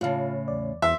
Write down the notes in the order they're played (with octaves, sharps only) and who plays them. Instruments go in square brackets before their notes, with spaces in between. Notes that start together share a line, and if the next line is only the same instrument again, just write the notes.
[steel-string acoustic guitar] A2 C#3 [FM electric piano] F4 F5 A5
[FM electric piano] E2 D5
[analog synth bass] E2 [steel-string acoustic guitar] C5 [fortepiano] E5